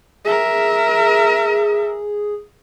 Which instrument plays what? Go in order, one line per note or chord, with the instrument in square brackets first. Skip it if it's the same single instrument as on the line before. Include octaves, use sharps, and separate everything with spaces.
[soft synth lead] G#4 [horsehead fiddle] A#4 E5